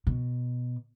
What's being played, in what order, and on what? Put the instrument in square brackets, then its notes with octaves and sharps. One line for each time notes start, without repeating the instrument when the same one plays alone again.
[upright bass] B2